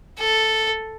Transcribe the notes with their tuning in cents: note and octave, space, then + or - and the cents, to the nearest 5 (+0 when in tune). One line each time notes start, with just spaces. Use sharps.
A4 +0